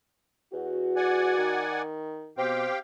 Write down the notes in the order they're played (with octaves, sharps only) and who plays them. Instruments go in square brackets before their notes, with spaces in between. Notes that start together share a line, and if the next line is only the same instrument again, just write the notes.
[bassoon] E2 [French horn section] F#4
[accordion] D5 F#5 G#5
[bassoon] D#3
[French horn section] B2 [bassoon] C4 [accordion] G4 F5 G5